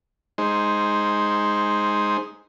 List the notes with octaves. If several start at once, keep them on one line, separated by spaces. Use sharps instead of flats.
G#3 D#4 C5